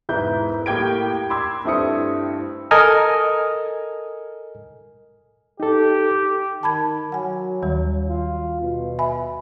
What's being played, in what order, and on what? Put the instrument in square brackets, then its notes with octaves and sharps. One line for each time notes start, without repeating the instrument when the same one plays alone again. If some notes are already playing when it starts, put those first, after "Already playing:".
[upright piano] E1 G#2 E4 B4 G6
A2 A#3 G4 G5 G#6 D7
B5 C6 D6 E6 G#6
G2 A3 C4 E4 D#6 C#7
[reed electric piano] A4 A#4 D#5 G#5 D#6 F6
[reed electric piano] D#4 A4 [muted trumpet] G4
[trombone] D#3 [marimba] A5 B5 G#6
[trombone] F#3 [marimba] F#5 G#5
[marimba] D#2 D#3 G3
[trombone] F4
B2
[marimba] E5 G#5 B5